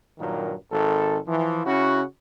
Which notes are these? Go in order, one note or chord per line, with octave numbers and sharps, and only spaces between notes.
G2 A#2 D#3 F#3 A#3
G#1 A4
E3 F3
C#3 C#4 E4 F#4